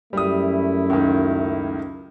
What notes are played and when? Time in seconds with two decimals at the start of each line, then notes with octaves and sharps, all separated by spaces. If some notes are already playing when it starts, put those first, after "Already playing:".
0.13 F#2 G3 A3 E4 D#6
0.90 C#2 D#3